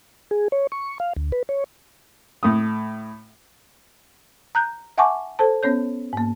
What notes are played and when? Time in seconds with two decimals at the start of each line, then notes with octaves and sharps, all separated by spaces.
0.31 G#4
0.52 C#5
0.72 C#6
1.00 F5
1.17 D2
1.32 B4
1.49 C#5
2.43 A2 D#6
4.55 A#5 F#6 G6
4.98 E5 F#5 G#5 A5 C#6 D6
5.39 A4 C5 A5
5.63 B3 C#4 C#5 G6
6.13 G#2 A#3